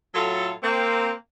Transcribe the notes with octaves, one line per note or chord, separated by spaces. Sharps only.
A2 F#3 F4 A4
A#3 C4